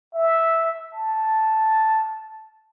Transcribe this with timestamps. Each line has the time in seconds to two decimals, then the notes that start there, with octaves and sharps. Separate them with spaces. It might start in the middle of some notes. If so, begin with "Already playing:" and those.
0.15 E5
0.94 A5